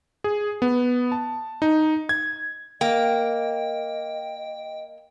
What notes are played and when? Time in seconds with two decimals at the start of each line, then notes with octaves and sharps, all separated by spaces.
0.24 G#4
0.62 B3
1.12 A5
1.62 D#4
2.09 G#6
2.81 A#3 D#5 G5